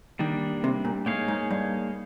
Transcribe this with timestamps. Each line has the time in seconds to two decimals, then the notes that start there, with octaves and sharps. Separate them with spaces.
0.19 D#3 G3 A#3 D4
0.64 C3
0.85 A#2
1.06 A2 A#3 D#4 G#4 C#5 F5
1.28 G#2
1.51 G2